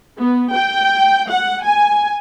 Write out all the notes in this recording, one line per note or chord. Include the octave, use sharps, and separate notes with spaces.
B3
G5
F#5
G#5